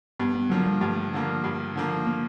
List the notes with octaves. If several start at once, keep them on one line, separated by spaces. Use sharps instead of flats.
G2 B3
B3
D3 F3 F#3 A#3
G3
G2 A3
D3 F3 A#3
G2
D3 F3 A#3
A#3